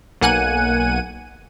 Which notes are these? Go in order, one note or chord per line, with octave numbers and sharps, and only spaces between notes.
B1 A#3 F#5 G#5 F#6 D#7